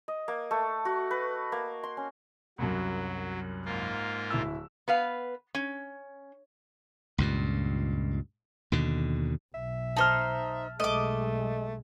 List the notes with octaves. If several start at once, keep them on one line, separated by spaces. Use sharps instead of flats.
D#5
A#3
A3
F#4
B4
A#3
C6
C#4
C2 F#2 F#3
G#2 A#3 F4
D1 E4 E6
B3 B4 F5
C#4
C#2 G2 A#2
D#2 B2 D3
B1 E5
D#4 C5 A5 F6
B1 G#3 A3 D#5 D6